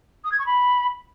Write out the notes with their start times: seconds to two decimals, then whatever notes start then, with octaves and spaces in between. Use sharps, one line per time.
0.24 D#6
0.31 G#6
0.39 C#6
0.46 B5